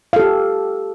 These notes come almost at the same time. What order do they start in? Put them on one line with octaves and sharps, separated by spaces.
F5 A4 G4